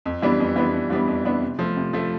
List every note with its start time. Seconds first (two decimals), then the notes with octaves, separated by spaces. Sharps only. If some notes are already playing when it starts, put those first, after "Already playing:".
0.06 F2
0.22 E3 G3 B3 D4
0.40 F2
0.56 E3 G3 B3 D4
0.73 F2
0.90 E3 G3 B3 D4
1.08 F2
1.25 E3 G3 B3 D4
1.41 C3
1.59 F3 A3
1.77 C3
1.93 F3 A3